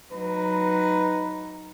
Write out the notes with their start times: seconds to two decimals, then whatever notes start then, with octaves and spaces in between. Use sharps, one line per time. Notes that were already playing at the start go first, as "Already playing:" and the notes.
0.12 F#3 D#4 B4